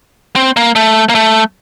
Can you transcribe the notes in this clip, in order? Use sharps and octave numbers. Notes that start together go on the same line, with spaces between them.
C4
A#3
A3
A#3
A3